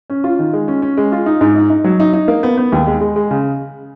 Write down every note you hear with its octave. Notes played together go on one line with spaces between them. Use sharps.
C#4
F4
D#3
G#3
C#4
C#4
G#3
F4
D#4
G#2
D#4
D#4
F#3
D#4
D#4
A#3
B3
B3
D#2
G#3
G#3
G#3
C#3